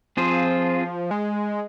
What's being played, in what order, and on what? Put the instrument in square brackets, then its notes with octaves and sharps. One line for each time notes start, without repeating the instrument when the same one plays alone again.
[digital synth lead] F3 [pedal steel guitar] C4 F4 G#4 C5
[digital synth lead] G#3